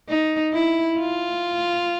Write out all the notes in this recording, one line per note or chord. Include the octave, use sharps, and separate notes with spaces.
D#4
E4
F4